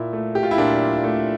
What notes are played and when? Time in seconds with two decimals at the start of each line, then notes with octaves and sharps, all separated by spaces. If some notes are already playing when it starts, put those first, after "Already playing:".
Already playing: A#2 E4
0.13 A3
0.35 G4
0.43 F4
0.51 E4
0.58 A#2 D4
1.04 A3